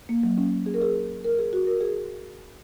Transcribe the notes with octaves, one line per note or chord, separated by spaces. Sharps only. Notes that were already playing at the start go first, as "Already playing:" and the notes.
A#3
F#3
C#4
G#4
A#4
G#4
A#4
G#4
F#4
A#4
G#4